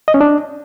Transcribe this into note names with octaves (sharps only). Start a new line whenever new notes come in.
D#5
C#4
D4